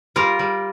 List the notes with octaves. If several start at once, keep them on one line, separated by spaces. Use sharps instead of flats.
G3 F4 A#4
G3